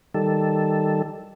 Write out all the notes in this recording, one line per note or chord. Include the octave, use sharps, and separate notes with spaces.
D#3 G3 A4